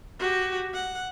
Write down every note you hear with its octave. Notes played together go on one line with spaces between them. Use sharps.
F#4 G4
F#5